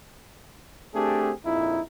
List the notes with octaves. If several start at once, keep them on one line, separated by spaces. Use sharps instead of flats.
A3 C4 D4 G4 G#4
A#1 F2 D#4 E4